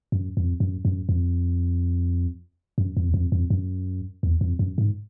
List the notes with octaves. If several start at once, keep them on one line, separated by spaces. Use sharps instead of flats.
F#2
F2
F#2
F#2
F2
F#2
F2
E2
F2
F2
F#2
E2
F2
F#2
G#2